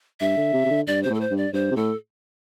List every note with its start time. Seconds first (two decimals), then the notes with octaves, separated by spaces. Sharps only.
0.20 G2 E5
0.37 D3
0.54 C3
0.66 C3
0.70 D3
0.87 G2 D5
1.03 C3 C5
1.10 A2 A4
1.21 C5
1.31 G2
1.37 D5
1.53 G2 C5
1.71 C3
1.76 A2 A4